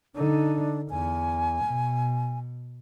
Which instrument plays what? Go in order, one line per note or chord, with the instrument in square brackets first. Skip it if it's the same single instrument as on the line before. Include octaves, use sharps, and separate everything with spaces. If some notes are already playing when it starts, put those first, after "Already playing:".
[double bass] D3 D#4 [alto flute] D4
[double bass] E2 [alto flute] G#5
[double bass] B2